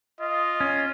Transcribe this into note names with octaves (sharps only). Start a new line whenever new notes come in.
F4 D#5
C#4